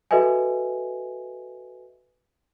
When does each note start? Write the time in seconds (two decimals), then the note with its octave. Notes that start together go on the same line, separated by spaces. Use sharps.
0.11 F#4 A4 B4 D#5 E5 G#5